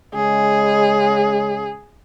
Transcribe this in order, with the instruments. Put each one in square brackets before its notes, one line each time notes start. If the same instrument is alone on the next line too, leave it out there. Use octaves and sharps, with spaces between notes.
[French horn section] C#3 G#3 [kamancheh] G#4